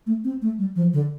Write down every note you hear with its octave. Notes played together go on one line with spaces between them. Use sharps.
A3
C4
A3
G3
F3
D3